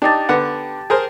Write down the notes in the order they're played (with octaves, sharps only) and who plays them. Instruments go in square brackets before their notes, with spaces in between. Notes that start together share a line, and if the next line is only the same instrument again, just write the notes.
[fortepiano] D4 D#4 [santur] G4 A5
[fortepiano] D3 B3 F#5
G#4 A#4 C5